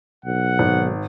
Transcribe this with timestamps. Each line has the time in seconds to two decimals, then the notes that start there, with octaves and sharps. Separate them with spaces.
0.25 B1 F#5
0.59 G#1